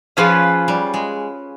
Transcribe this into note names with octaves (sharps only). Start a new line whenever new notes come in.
F3 C#4 F4 G#4 B4
G3
G#3